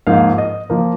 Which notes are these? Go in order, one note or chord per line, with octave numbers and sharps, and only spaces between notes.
G#2 F3 A#3 F5
D#5
F3 A#3